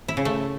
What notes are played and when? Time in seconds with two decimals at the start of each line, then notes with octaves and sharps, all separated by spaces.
0.08 E4
0.17 C#3
0.25 A3